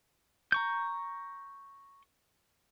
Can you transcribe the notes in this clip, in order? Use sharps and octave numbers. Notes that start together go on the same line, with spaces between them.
A#5 C#6 G6